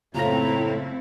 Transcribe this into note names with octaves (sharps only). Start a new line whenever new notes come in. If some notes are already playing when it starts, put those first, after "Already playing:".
F#1 A2 A3 C4 E4 F4 A#5 A#6